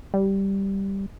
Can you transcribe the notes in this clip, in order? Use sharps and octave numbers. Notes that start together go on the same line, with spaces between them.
G3